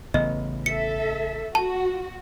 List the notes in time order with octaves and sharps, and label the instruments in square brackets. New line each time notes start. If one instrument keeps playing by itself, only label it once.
[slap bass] A1 C#3 B3 [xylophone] D#5
[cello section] A4 E5 [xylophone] C#7
[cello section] F#4 [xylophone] A5